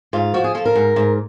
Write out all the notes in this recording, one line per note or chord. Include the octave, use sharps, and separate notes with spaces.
G#2 F4
F3 F#4
G#4
F3 A4
A#4
G#2
G#2